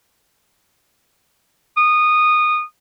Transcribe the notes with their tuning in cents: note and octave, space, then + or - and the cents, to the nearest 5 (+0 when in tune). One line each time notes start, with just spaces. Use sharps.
D#6 -20